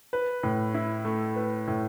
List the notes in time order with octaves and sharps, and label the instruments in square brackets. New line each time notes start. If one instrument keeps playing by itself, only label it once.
[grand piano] B4
A2
E4
A3
B4
A2